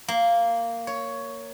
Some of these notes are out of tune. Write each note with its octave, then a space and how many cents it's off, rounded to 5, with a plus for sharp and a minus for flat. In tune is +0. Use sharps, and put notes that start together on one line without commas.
A#3 -10
C#5 +10